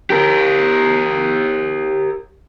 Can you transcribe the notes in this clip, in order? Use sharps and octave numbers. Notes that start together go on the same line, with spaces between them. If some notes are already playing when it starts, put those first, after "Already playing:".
G4 A#4